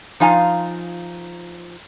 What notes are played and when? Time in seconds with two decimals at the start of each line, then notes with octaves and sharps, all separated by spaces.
0.20 F3 D#4 F4 F5 G#5 A#5